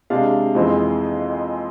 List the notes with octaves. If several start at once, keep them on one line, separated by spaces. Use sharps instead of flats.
C3 G#3 D4 F5
F2 E3 G#3 C4